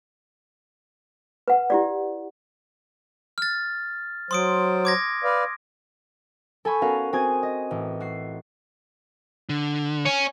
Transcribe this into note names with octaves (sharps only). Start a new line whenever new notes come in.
B4 F#5
E4 G4 D5
F6 A6
F#3 C5 C6 D#6 D7
D6 G#6 A#6
B4 D5 F5
A4 G#5 B5 C#6 G6
B3 C#4 F#4 A#4 F5 F#5
C4 F#4 G#5 D#6 G#6
D#5
A1
F#4 C7
D3
C#4